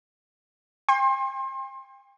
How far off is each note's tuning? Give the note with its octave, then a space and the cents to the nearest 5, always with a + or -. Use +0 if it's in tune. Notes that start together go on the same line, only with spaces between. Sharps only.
G5 +40 C6 +35